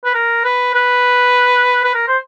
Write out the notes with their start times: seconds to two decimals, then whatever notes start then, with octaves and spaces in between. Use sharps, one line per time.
0.05 B4
0.14 A#4
0.44 B4
0.74 B4
1.84 B4
1.94 A#4
2.08 C5